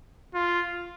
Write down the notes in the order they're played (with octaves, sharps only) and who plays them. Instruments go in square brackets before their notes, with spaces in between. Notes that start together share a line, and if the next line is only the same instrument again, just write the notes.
[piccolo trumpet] F4